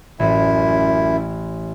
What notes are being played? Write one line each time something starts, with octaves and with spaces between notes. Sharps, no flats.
A1 F#2 E4